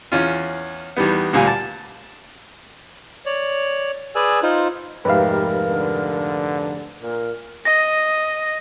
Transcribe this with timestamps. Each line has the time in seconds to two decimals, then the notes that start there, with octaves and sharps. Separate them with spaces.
0.12 E2 C#4 F4
0.97 E2 D#3 G3 B3
1.33 D2 A#2 G3 F5 G#5
1.47 A5
3.26 C#5 D5
4.15 G#4 B4 D5 G#5 E6
4.43 D#4 F4 C5
5.05 F1 G#2 G4 A#4 B4 E5 F5
5.70 D3
7.02 A#2 A#4
7.65 D#5 A#6